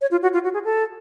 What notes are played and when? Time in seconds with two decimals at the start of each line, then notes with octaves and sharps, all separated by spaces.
0.01 C#5
0.11 F4
0.23 F#4
0.34 F4
0.44 F#4
0.54 G#4
0.64 A4